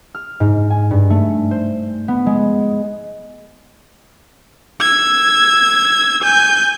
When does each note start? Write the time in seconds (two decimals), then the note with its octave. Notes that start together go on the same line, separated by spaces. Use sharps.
0.15 F6
0.40 G#2
0.70 G#5
0.91 G2
1.10 A3
1.51 C5
2.08 B3
2.26 G#3
4.81 E6 G#6
6.22 G#5 G6